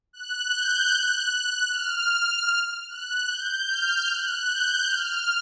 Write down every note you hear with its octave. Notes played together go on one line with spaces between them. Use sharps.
F#6
G6
F#6
F6
F#6
G6
F6
F#6
G6
F6